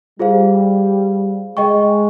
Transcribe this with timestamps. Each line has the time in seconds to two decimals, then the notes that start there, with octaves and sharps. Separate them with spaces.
0.19 G3 F4 G#4 C5 F5
1.56 G#3 G#4 D#5 G5 C#6